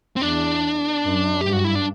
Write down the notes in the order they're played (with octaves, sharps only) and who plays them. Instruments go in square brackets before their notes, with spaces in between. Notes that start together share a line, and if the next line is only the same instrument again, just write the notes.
[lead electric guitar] C4
[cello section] E2 [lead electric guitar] D4
[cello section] F#2
[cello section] G2 [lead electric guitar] G4
[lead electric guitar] F#4
E4
D4